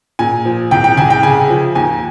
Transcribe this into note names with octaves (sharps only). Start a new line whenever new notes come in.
A#2 G#5
F3
C2 G5
G5
C2 G#5
G5
C#3 G#5
F3
D#2 G#5